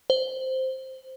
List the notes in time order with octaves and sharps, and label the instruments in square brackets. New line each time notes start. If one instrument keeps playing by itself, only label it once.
[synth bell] C5